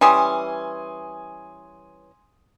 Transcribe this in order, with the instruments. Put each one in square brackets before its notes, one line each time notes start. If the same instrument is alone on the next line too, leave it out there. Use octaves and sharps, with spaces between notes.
[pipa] E3 G3 C#4 [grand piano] G#5 C6 D#6